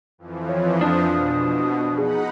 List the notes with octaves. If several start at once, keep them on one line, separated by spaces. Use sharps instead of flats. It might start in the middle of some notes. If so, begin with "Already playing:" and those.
F2 E3 F3
C#5
F3 D4 D#6
B2
D#4 G#4 F#5 B5